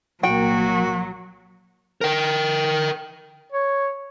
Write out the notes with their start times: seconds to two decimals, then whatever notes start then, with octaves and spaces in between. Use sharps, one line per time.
0.23 C2 A#2 F#3 A#3 F#4 G5
2.01 A#4 G5
3.52 C#5